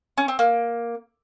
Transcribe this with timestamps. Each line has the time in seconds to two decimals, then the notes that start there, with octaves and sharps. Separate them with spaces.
0.17 C#4
0.28 C4
0.39 A#3